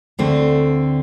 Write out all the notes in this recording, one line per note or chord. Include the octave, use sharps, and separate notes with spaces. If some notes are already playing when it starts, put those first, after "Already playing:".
D2 D3 A3 C4